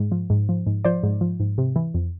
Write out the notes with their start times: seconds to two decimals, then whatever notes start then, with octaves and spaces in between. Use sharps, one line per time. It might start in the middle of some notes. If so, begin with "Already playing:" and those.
Already playing: G#2
0.12 F3
0.30 G#2
0.49 F3
0.66 G#2
0.85 F3 C5 D5
1.03 G#2
1.21 F3
1.40 G#2
1.58 C3
1.76 E3
1.94 F2